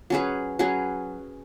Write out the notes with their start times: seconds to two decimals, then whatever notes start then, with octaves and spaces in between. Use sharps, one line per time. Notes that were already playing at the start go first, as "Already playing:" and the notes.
0.10 F#3 C#4 G#4 B4
0.59 F#3 C#4 G#4 B4